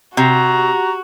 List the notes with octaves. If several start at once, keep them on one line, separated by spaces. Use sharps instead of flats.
C3 F#4 A#5